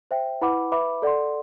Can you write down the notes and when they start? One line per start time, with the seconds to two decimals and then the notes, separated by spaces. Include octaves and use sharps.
0.11 C5 E5 G5
0.41 E4 B4 F#5 B5 D6
0.72 B4 E5 B5 D6
1.02 A4 D5 F#5 C6